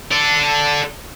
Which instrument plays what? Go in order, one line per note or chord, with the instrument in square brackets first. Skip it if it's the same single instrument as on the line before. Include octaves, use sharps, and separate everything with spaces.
[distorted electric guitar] A4 D5